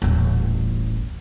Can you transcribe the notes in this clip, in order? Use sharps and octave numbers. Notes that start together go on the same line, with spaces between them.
D#1 A1